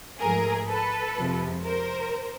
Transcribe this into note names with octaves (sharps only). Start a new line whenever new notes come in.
G#2 F3 A3 G#4 A#4
A4 B4
F2 C3 F3 G#3
A#4 C5